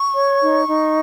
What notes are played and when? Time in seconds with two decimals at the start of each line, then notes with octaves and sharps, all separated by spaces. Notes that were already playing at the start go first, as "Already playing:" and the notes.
Already playing: C#6
0.14 C#5
0.41 D#4
0.67 D#4